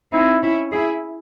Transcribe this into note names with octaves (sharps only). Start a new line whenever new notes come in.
C4 D#4 E4
C#4 E4
E4 G#4